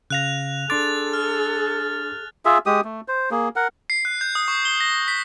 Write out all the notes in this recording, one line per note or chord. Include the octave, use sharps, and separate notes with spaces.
C#3 F5 F#6 A#6 F7
D4 G#4 A4 C6 D6 A6
F6
F4 G#4 E5
G#3 G4 D#6
A3
C5
A#3 G#4
A#4 F#5
C7
F#6
G6
D#6
C#6
G7
A#6
B6